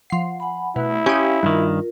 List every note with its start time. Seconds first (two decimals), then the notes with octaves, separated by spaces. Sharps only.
0.10 F3 F#5 C7
0.40 F#5 G#5 B5
0.76 B2 A3 E4
1.06 C#4 G4 F5 G5 C6 D#6
1.43 G2 D#3 F4 A#4